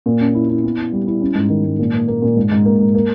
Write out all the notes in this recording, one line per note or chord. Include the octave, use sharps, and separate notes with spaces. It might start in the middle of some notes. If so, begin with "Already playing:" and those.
A#2
C#4
E4
E4
B3
E4
G3
E4
C#4
G#2
D#3
G#2
A#2
A#3
A#3
A#2
G#2
G#2
A#3
G#2
A#3